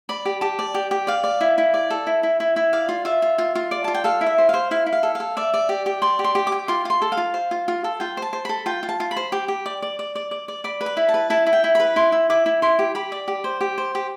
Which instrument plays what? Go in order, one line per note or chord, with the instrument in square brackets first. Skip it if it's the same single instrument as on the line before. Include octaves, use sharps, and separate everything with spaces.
[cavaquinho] D5 B5
G4
G4 A5
D5
G4
G4
D5 F5
D5
E4
E4
D5
A4
E4
E4
E4
E4
D5 F5
F4
F4 E5
F4
F4
F4
D5
F4 A5
G5
A4 F5
E4
E5
C5
C5 F5
E4 F5
E4
F5
A4
A4 F5
D5 E5
D5
G4
G4
D5 C6
G4
C6
G4
D6
G4
F4 C6
F4 C6
A4
F5
F4
C5
F4
F4
A4
F4 G5
C5 A5
C5
A4 B5
F4 G5
F4
A5
F4
B5
C5
G4
G4
D5
D5
D5
D5
D5
D5
D5 B5
B4
B5
E4
A5
B4
E4 A5
E4
G5
E4
B4 B5
E4 C6
E4
E4 D6
E4
E4 C6
G4
G4 B5
D5
G4
C5
G4
C5
G4